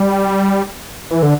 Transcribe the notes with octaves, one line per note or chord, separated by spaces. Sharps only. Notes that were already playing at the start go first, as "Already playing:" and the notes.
Already playing: G3
E3
D3